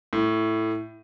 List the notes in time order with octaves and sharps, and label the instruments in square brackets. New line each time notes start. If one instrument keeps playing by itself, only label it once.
[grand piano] A2